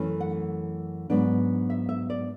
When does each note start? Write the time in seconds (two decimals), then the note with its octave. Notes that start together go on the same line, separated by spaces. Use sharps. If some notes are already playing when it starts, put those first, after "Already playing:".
Already playing: F#2 E3 A3 C#4
0.20 F#5
1.10 G#2 F#3 B3 D4
1.70 E5
1.89 E5
2.10 D5